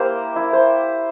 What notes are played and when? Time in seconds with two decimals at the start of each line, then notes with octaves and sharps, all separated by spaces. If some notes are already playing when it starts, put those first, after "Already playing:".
Already playing: A#3 E4 G4 A#4 C5
0.36 E4
0.53 C5